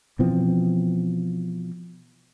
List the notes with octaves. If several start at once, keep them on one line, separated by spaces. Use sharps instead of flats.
B2 E3 F3 C4